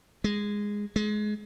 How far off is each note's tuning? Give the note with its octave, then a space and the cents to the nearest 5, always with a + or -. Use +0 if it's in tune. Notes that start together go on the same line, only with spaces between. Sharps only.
G#3 -10
G#3 +25